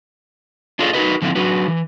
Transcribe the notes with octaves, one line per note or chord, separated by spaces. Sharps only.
D4 F4 G#4 A4 C#5 D#5
D#4 F#4 G#4 A#4 B4 D#5
D3 F3 A3 C4 D#4 E4
F#3 D4 F#4 B4
E3